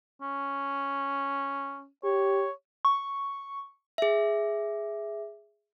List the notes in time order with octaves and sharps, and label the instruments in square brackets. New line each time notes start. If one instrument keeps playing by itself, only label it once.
[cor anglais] C#4
[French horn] G4 [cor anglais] C#5
[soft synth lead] C#6
[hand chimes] G#4 E5